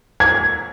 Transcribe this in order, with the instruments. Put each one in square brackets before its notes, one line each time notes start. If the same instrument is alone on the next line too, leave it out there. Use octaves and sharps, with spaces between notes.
[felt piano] G#6